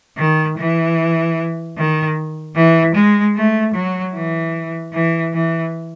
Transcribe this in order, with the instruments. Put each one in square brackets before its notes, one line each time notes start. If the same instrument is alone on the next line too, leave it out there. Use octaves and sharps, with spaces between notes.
[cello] D#3
E3
D#3
E3
G#3
A3
F#3
E3
E3
E3